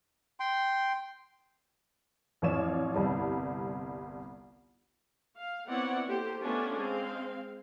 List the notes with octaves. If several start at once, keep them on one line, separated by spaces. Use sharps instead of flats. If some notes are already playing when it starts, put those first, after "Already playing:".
G5 C6
A1 F2 F3 C#5 D5 E7
G1 C2 G3 A5
F5
B3 C4 E4 C#5 D5 F#5
A#3 G4 A4 C5
A3 B3 C#4 D4 F4
G#3 C4 F5